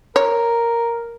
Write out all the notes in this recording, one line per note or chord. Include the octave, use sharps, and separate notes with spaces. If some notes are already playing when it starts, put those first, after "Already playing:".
A#4 C#5